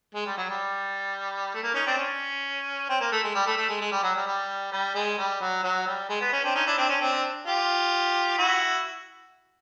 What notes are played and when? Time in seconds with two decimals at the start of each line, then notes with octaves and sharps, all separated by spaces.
0.15 G#3
0.26 G3
0.37 F#3
0.49 G3
1.54 A3
1.63 A#3
1.74 C#4 D#4
1.86 C4 D4
1.97 C#4
2.89 C4
3.01 A#3
3.12 A3
3.23 G#3
3.35 G3
3.47 A3
3.57 A3
3.69 G#3
3.81 G#3
3.92 G3
4.03 F#3
4.15 G3
4.26 G3
4.72 G3
4.95 G#3
5.18 G3
5.41 F#3
5.64 F#3
5.86 G3
6.09 G#3
6.21 B3
6.33 C#4
6.44 C4 D4
6.55 C#4 D#4
6.66 D4 E4
6.78 C4 D4
6.89 C#4
7.01 C4 D4
7.46 F4 G4
8.38 E4 F#4